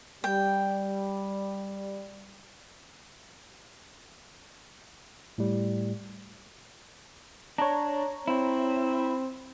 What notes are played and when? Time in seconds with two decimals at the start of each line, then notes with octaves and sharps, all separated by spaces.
0.24 G3 G5
5.38 A2 G3
7.58 D4 C#5 A#5
8.28 C4 E4